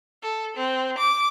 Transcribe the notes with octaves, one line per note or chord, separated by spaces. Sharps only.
A4
C4
D6